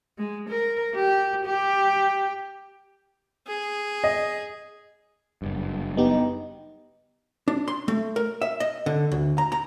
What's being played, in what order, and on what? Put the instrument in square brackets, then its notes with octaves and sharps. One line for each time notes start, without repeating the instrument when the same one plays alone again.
[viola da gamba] G#3
A#4
G4
G4
[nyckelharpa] G#4
[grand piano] D#5
[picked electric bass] F#1 G2
[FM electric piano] B3 G4 [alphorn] D#4
[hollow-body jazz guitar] D4
C6
A3
A#4
E5
D#5
D3
D2
A#5
A#5